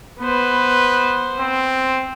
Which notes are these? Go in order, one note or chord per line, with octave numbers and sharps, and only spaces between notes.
B3 B4 C5
C4